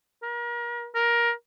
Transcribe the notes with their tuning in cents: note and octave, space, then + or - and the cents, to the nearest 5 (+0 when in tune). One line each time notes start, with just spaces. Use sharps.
A#4 +35
A#4 +15